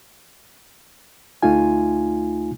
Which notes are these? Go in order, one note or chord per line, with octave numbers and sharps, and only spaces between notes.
D2 A3 D#4 F4 G#5